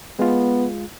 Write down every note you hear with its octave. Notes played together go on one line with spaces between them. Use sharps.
G#3 B3 F4